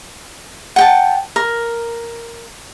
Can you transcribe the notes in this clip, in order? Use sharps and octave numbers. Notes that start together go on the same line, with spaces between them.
F#5 G5 A5
A#4